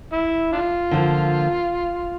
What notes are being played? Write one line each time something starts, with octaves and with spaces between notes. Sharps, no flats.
E4
D4 F4
D3 F3 A#3